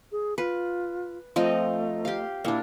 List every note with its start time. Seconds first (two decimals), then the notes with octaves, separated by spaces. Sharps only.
0.12 G#4
0.38 F4 B4
1.36 F3 A3 C4 D#4 F4 D#5
2.05 G4 F5
2.45 A#2 A#3 D4 E4